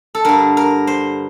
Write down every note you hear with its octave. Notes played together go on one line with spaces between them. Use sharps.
A4
G2 D3 A#4
A#4
C5